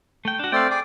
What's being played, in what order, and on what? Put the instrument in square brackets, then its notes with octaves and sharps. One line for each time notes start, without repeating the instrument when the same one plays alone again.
[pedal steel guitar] A3 G5
D4 F#4
[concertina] A3 C4 D5 [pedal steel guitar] F5 G5
[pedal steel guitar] G#4 [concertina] D5 G5 D6